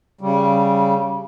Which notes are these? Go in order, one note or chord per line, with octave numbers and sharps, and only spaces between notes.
C#3 G3